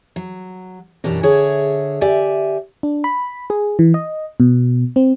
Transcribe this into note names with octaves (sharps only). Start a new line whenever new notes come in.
F#3
F#2 B2 E3 D4 G4 A#4
D3 G#4 C#5 E5
G4 D5 E5 G#5
D4
B5
G#4
E3
D#5
B2
C4